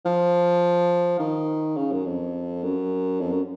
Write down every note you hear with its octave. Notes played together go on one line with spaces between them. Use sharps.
F3
D#3
C#3
F#2
F2
F#2
F2
F#2